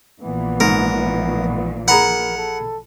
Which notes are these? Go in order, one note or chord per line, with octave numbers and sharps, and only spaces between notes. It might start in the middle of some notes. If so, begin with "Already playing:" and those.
A#1 A#2 E3 B3
G#2 A#4
G#4 A#4 F#5 A#5 B5
A4